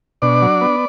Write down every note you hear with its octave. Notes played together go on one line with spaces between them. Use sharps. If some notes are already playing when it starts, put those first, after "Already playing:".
B2 D4 D5
F#3
B3